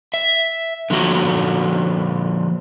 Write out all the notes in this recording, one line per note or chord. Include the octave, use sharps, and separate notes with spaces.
E5
D3 F3 A#3 F#4